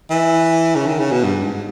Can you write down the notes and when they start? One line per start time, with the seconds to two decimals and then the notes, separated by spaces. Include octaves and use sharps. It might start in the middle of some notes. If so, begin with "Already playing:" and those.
0.10 E3
0.75 C#3
0.86 D#3
0.99 C#3
1.11 B2
1.24 G2
1.43 G#2